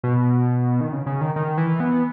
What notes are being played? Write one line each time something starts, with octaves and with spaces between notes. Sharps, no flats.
B2
D#3
C#3
C#3
D#3
D#3
E3
B3